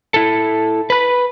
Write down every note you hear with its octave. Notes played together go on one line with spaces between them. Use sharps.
E4 A4
B4 B5